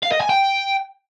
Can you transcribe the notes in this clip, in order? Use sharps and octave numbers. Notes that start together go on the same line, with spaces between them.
F5
D#5
G#5
G5